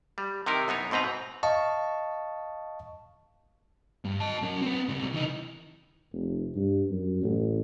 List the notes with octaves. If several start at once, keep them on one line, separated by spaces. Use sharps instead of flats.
G3
C3 D#3 D#4 E4 A#4
F#2 B3 D#4 C#5
G#2 B2 C4 B4 A#5
D#5 F5 A5 C#6
G2
D#5 A5
F#3 C#4
C4 B4
C#2 C3
E3 D#4
F1
G2
F#2
A1